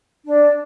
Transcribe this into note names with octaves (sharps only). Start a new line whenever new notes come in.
D4